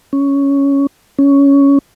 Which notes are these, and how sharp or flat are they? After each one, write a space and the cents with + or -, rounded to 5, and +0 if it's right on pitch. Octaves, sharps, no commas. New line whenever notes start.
C#4 +5
C#4 +10